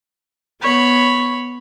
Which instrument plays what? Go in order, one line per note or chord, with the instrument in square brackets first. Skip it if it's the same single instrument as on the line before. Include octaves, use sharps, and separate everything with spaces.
[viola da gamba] B3 [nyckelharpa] C#5 B5